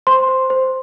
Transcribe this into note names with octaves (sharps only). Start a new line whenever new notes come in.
C5 C6
C5
C5